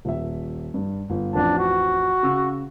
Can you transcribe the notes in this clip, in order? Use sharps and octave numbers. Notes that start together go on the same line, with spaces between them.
D#1 E5
G2
G1
A1 F2 D4 A5
F#4
C#3 E6